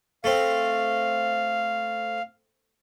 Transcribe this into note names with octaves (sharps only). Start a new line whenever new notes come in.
A3 C4 F5